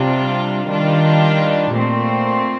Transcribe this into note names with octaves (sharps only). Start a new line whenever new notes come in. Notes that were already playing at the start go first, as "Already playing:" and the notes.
Already playing: C3 G3 D4 F4
D#3 G3 D4 F4
A#2 A3 C4